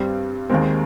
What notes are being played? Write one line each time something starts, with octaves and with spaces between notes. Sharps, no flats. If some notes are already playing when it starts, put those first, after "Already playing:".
Already playing: G2 G3 C4
D#2 D#3 G#3 C4